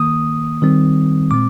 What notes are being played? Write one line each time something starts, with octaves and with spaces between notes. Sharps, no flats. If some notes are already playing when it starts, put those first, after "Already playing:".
Already playing: D#3 A#3 D#6
D#3 G3 C4
A#2 G#3 C4 D6